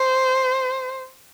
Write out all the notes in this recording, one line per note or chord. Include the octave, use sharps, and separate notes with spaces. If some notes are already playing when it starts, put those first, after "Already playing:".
Already playing: C5